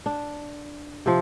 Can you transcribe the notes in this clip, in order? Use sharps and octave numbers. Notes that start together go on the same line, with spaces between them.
D4
C3 F3